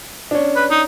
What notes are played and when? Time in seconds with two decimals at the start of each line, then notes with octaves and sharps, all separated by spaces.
0.31 C#4 D4
0.56 B4
0.71 D#4